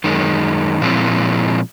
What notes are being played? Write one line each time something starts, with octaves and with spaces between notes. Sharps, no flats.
F#2 D#3 G#3
A#2 F3 G#3 C4 E4